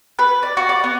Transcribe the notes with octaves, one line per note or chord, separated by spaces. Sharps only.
B4
D5
F#4
D5
B3